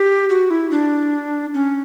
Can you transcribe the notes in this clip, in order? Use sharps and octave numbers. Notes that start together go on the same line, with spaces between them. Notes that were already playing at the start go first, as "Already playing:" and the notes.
Already playing: G4
F#4
E4
D4
C#4